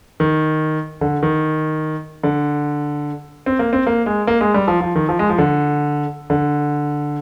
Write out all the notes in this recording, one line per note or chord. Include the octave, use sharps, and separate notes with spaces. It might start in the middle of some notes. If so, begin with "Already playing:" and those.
D#3
D3
D#3
D3
C4
A#3
C4
A#3
G#3
A#3
G#3
G3
F3
F3
D#3
F3
G#3
F3
D3
D3